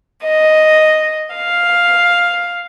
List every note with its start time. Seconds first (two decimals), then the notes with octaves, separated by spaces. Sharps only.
0.24 D#5
1.35 F5